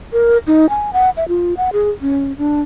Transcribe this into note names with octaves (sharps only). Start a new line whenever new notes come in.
A#4
D#4
G#5
F#5
E5
F4
F#5
G#4
C#4
D4